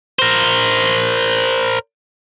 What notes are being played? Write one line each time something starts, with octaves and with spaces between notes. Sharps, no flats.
A#4 C5